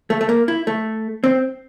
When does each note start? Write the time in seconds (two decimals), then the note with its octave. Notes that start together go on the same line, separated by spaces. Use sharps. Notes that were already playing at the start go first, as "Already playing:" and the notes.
0.10 A3
0.21 A3
0.29 A#3
0.48 E4
0.67 A3
1.24 C4